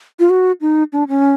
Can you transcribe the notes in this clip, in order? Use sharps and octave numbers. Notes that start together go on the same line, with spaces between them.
F4
F#4
D#4
D4
C#4